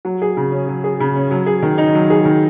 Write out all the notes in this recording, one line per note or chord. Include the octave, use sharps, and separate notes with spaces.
F#3
G#4
C#3
C#4
F#3
G#4
C#3
C#4
F#3
G#4
D#3
D#4
F#3
G#4
D#3